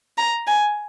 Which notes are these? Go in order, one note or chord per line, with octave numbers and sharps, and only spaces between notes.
A#5
G#5